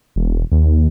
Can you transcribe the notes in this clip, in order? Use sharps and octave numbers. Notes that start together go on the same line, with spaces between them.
E1
D#2